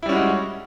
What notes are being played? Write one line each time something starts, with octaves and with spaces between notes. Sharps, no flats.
G3 G#3 C#4 E4 F#4